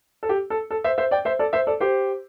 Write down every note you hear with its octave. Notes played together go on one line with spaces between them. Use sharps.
A4
G4
A4
A4
C5 E5
C5 E5
D5 G5
C5 E5
A4 D5
C5 E5
A4 D5
G4 C5